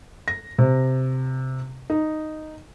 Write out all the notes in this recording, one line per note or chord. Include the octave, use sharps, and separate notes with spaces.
A#6
C3
D#4